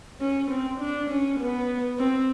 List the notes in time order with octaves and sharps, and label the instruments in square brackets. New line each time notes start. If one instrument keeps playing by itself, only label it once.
[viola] C#4
C4
D4
C#4
B3
C4